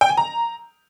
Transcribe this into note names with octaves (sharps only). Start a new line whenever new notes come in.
G5
G#5
A#5